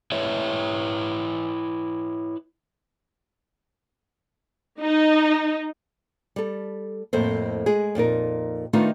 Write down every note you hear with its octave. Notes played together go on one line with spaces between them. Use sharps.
E4 B4 C#5 D#5 E5
D#4
G3 A4
F2 A2 A#3 A4 C5
G#3 G#4
F2 A#2 D#4 A#4
D#3 A3 B3 D4 D#4 F4